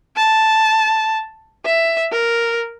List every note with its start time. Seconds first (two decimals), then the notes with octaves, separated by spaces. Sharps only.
0.17 A5
1.65 E5
2.12 A#4